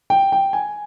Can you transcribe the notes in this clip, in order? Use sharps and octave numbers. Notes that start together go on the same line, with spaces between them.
G5
G5
G#5